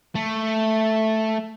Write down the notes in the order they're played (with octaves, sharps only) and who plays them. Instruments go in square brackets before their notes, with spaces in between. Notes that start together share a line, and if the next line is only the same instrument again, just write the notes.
[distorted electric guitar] A3